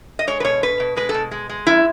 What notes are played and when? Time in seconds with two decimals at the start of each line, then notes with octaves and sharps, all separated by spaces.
0.19 D#5
0.27 G#3 C#5
0.40 B4
0.44 B2 C#5
0.63 B2 B4
0.80 B2
0.96 G#3 B4
1.09 A4
1.14 B2
1.31 G#3
1.49 G#3
1.67 F#2 E4